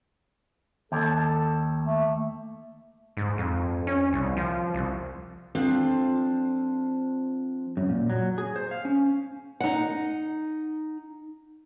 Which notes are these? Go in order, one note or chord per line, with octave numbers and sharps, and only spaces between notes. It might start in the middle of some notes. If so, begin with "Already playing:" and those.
D#2 A4
A3
G#2
F2
C#4
C2
F3
C2
F3 C4 D4 F4 A4
F#2
A#2
F#3
G#4
C5
F5
C#4
D#4 F#5